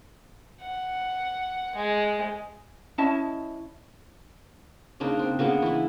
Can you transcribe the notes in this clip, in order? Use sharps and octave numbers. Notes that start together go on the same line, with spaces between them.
F#5
G#3
C#4 E4 D#5 A5
C#3 A#3 D4 D#4
C4
C#3 A#3 B3 D4
E3 E4